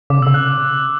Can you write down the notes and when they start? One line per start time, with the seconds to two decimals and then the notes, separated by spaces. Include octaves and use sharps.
0.10 C#3 D6
0.21 B2 E6
0.27 C#3
0.34 F#6